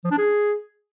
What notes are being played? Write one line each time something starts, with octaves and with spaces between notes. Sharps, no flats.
F3
D4
G#4